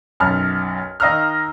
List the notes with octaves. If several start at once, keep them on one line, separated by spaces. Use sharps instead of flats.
B1 F#2 A5 F6
D#3 D#5 F5 A#5 E6 F6